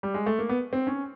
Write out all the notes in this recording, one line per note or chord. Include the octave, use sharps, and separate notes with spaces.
G3
G#3
A3
A#3
B3
C4
C#4